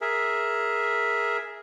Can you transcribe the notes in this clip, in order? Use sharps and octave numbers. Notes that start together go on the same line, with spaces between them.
G#4 A#4 E5